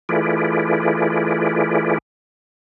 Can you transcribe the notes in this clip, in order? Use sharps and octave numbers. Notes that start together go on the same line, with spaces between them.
E3 A3 F4 G#4 B4 D5